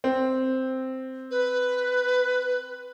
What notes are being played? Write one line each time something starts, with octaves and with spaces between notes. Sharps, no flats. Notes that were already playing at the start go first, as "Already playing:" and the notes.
C4
B4